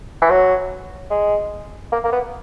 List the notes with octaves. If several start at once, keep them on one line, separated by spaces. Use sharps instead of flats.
E3
F#3
G#3
A#3
A#3
B3